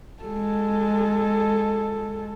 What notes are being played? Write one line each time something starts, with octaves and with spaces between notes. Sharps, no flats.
G#3 A4